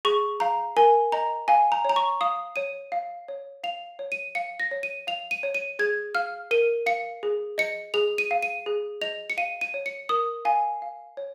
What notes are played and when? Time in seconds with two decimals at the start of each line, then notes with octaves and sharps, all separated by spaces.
0.05 G#4 C#6
0.40 F5 A#5
0.77 A#4 G#5
1.12 D#5 A#5
1.48 F5 G#5
1.72 A#5
1.85 C#5 A#5
1.96 C#6
2.21 F5 D#6
2.56 C#5 D#7
2.92 F5
3.28 C#5
3.64 F5 F7
3.99 C#5
4.12 D#7
4.35 F5 C#7
4.60 A#6
4.71 C#5
4.83 D#7
5.07 F5 F7
5.31 D#7
5.43 C#5
5.55 D#7
5.79 G#4 G#6
6.15 F5 F6
6.51 A#4 D#7
6.86 F5 C#7
7.23 G#4
7.58 D#5 C#7
7.94 G#4 F7
8.18 D#7
8.31 F5
8.43 D#7
8.66 G#4
9.02 D#5 F7
9.30 C#7
9.37 F5 D#7
9.61 D#7
9.74 C#5
9.86 C#7
10.09 A#4 D#6
10.45 F5 G#5
10.82 F5
11.17 C#5